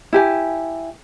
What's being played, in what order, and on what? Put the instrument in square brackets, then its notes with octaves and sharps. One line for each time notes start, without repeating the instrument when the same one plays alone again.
[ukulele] E4 G4 G#5